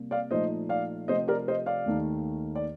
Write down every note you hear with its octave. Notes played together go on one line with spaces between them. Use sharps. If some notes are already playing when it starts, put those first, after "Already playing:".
Already playing: C3 G3 A#3
D5 F5
A#2 F3 A3 D#4 C5 D#5
D5 F5
C3 F3 A3 C4 C5 D#5
A#4 D5
C5 D#5
D5 F5
D#2 D#3 A3 D#4
D5